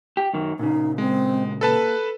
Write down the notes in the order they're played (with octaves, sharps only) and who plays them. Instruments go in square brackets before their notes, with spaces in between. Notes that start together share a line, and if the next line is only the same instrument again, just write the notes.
[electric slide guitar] G4
F#2 D#3
[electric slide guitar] A#2 C#3 [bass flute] D#4
[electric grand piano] G#3 [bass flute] C4
[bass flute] A#3 [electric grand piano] A4 B4 A5